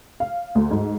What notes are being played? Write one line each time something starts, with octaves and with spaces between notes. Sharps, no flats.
F5
D2
G#2